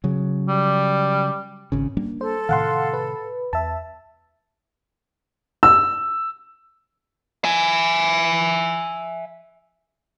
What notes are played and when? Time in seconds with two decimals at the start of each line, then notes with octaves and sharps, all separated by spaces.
0.04 C#3 F#3
0.48 G3
1.72 G#1 C#3
1.97 G3 A#3 D4
2.21 A4 C5
2.49 A2 C3 D#3 F5 F#5 C6
2.93 B4
3.53 E2 E5 A5
5.63 E6
7.44 E5 G#5